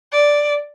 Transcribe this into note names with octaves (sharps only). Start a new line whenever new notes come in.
D5